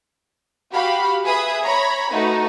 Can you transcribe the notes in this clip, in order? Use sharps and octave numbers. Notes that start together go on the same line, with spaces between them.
F#4 G4 F5 B5
G#4 B4 E5 B5 D#6
C#5 A#5 B5
A3 D#4 F#4 B4